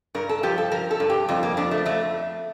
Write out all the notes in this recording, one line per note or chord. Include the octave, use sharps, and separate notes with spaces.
G2 A#4
A4
F3 G4
A4
F3 A#4
A4
G2
G4
F2 F4
A#3
F3 D4
A3
F2 A3